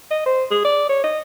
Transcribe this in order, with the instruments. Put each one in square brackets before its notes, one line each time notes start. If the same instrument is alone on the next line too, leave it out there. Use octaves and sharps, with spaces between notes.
[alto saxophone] D#5
C5
G#4
D5
C#5
D#5